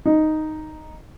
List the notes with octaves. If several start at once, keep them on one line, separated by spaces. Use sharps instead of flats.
D#4